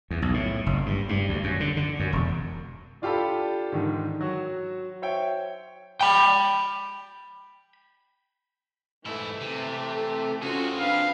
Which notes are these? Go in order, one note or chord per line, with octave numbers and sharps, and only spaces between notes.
E2
B1
A2
F#1
G2
G2
D2
F#2
D3
D3
F#2
E1
D4 F4 G4 A4 B5
G#2 D3 D#3
F#3 F#4
C5 C#5 E5 G5
G5 B5
G#2 E3 A3 E4
C3
A4
C4 C#4 F4 F#4 G#4
D4 B4 F5